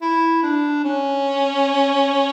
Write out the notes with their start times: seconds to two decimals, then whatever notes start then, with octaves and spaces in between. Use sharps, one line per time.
0.02 E4
0.43 D4
0.84 C#4